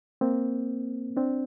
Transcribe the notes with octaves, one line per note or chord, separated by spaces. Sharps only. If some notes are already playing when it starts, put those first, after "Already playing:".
A#3 C4
C4 D4